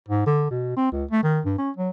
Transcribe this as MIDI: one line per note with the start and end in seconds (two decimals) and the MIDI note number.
0.09 0.25 44
0.26 0.47 50
0.51 0.74 47
0.77 0.91 60
0.92 1.04 37
1.11 1.22 57
1.24 1.40 51
1.45 1.54 43
1.58 1.70 61
1.77 1.90 54